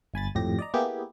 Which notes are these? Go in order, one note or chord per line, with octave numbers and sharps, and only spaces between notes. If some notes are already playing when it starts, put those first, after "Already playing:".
G1 G#5 B5 A6
G#1 F2 A2 G4 A#6
D5 D#5 A#5
A#3 B3 E4 G4 G#4